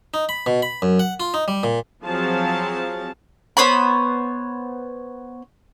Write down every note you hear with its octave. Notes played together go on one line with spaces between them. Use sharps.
D#4
B5
B2
B5
F#2
F#5
F4
D#4
G3
A#2
F3 F#3 C4 G#4 F5 A5
B3 C5 C#5 B5